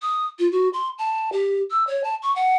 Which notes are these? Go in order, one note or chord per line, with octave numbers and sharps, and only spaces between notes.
D#6
F4
F#4
C6
A5
G4
E6
C#5
A5
C#6
F#5